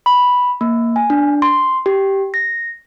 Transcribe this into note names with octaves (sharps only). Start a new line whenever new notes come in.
B5
A#3
G#5
D4
C6
G4
A#6